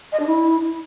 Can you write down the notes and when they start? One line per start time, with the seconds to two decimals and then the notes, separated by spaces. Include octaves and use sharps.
0.12 D#5
0.20 D4
0.27 E4